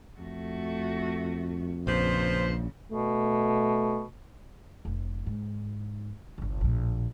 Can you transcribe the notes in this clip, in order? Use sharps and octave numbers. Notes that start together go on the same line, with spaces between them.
F2 A3 F#4
A#1 C#3 F3 B4 C5
B2 A3
F1 C3
G#2
G1 C2
A#1 A2